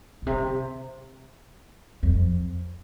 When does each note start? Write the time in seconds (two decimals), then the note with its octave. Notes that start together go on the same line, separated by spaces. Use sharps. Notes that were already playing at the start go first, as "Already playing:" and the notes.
0.22 A#2
0.27 C3
2.03 F2